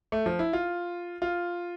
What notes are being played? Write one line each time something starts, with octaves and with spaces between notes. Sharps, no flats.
A3
F3
E4
F4
F4